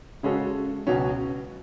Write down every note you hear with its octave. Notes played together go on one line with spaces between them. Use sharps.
C#3 G#3 C#4 F#4 A4
C#2 B2 F#3 C#4